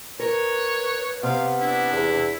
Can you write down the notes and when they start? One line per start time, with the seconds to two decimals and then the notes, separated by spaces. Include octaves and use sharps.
0.20 A#4 B4 C#5
1.23 C3 B3 F5
1.60 D4 E4
1.93 E2